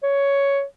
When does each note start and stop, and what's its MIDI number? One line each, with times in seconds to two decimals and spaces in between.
0.03 0.63 73